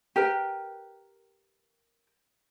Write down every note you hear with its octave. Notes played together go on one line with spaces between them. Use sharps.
G4 A#4 B4 G5